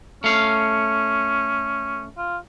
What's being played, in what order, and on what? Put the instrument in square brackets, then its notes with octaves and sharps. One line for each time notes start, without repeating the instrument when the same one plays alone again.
[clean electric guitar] A3 F5 [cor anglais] C#4
[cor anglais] F4